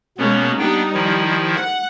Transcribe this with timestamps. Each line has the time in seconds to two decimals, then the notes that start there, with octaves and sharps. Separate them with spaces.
0.18 B2 G#3 A#3 B3 C#4
0.59 G3 B3 D4 D#4 G5
0.94 D#3 F3 E4
1.55 F#5